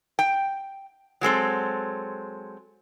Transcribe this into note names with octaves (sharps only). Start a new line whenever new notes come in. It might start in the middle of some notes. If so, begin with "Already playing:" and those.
G5
F#3 G#3 C4 A4